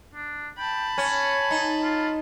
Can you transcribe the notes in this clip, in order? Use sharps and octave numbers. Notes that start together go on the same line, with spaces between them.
D4
G5 A5 B5
C#4 G#5
D#4
F4